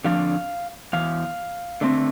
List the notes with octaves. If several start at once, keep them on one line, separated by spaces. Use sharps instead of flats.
F2 D3 F3 D4 F5
E2 E3 F5
D3 A3 C4